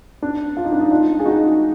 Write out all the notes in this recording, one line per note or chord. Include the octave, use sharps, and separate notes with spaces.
D4
F4
D#4
D4
D#4
D4 F4
G#4
D#4 F#4